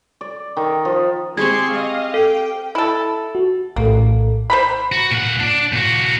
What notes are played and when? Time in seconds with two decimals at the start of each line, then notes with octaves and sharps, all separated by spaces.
0.21 D5
0.57 D#3
0.85 F3
1.37 G#3 C4 G4 G#4 C6 C#6 G#6
1.72 D#5 F5
2.14 A4 G5
2.75 E4 A4
3.35 F#4
3.76 A#1 A2 A#3 A4
4.50 C5 A#5 B5
4.92 F#4
5.11 A#2 F#5
5.40 D4 D5
5.73 A#2 F#4